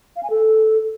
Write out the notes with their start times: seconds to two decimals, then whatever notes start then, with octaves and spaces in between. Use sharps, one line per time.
0.16 F5
0.23 G#5
0.30 A4